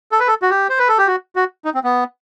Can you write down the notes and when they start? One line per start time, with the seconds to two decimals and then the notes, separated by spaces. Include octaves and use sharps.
0.12 A4
0.20 B4
0.28 A4
0.42 F#4
0.50 G4
0.69 C5
0.79 B4
0.88 A4
0.98 G4
1.07 F#4
1.36 F#4
1.65 D#4
1.74 C4
1.84 B3